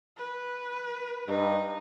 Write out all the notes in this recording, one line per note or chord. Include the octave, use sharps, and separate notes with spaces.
B4
G2 D#4